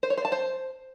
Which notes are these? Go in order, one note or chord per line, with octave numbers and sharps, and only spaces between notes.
C5
C#5
C5
A5
C5